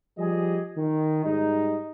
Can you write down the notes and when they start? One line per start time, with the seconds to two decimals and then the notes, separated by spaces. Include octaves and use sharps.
0.19 F3 G3 G4 G#4 D#5
0.77 D#3
1.23 G#2 G3 D#4